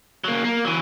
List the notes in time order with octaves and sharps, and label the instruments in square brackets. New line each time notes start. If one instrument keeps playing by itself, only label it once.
[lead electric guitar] F#3 A#3
A#3
E3 F#3